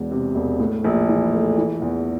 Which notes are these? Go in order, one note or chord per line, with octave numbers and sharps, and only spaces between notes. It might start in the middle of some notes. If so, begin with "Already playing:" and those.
Already playing: E1 E2
C3
E1
A2
A#1
E3
A3
E3
E2